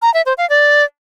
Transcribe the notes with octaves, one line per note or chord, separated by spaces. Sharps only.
A#5
E5
C5
F5
D5